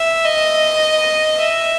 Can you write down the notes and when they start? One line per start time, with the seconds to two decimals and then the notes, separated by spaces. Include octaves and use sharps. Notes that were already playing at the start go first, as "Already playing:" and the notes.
Already playing: E5
0.24 D#5
1.38 E5